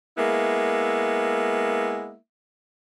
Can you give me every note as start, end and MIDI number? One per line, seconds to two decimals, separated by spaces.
0.17 2.15 56
0.17 2.15 58
0.17 2.15 59
0.17 2.15 64
0.17 2.15 76